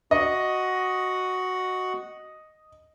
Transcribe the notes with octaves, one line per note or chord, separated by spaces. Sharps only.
F#4 D#5 F#5